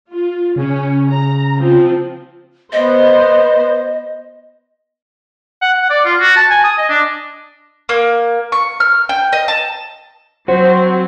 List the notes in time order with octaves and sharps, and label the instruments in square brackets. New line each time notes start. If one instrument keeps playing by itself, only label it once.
[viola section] F4
[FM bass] C#3 [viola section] C#4
[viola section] A#5
F3 C4 F4
[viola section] B3 C5 [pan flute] D#5
[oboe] F#5
F#5
D5
F4
F#4
A5
G#5
D#6
D#5
D4
[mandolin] A#3
C#6
F6
G5
D#5
A5
[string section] F#3 C4 [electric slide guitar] F#4 [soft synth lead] C5